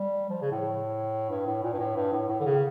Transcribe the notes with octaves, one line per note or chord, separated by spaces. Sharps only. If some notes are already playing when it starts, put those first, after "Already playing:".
Already playing: G3
F3
C#3
A2
G2
A2
A#2
G2
A2
G2
A2
A2
D3
C#3